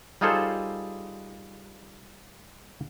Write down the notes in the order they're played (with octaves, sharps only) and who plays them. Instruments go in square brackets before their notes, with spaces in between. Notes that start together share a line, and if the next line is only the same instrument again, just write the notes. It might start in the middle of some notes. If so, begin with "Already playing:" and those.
[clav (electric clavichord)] G3 D#4 F4 G#4 A4 C5